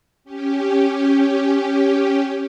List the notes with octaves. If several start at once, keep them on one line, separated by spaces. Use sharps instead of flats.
C#4 G4